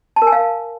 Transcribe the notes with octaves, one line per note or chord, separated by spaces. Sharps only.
A5
A#4
G#5
F5